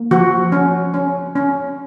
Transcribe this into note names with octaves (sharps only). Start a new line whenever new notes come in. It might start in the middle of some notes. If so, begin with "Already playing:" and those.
Already playing: A#3
F3 F#4
C#4
C#4
C#4